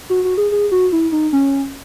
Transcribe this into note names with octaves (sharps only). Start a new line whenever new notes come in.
F#4
F#4
G#4
G#4
F#4
E4
D#4
C#4